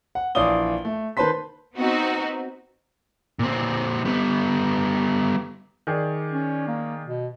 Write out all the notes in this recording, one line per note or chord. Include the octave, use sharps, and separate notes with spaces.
F#5
A#1 E3 D5 F5 D#6 G7
A3
D#3 B4 C5 A5 C6 B6
B3 C4 D#4 F#4
A#2 C4
G3 B3
D#3 G#4 D5
C#4
A#3
B2